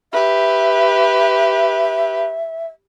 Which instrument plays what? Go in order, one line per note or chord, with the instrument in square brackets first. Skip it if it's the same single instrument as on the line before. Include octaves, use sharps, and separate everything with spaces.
[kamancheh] G4 B4 [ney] E5